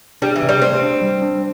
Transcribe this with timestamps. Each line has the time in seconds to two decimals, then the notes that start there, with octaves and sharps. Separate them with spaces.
0.22 G3 D4
0.36 E3
0.43 C3
0.49 G3
0.62 A3 C4
0.82 D4
1.02 G3
1.22 D4